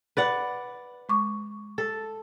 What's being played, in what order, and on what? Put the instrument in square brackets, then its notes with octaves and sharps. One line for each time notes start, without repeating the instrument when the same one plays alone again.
[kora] B4 D5 F#5
[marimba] G#3 C#6 D6
[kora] A4